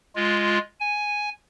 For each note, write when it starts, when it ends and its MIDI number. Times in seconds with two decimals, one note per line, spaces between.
0.15 0.58 56
0.15 0.58 65
0.80 1.29 80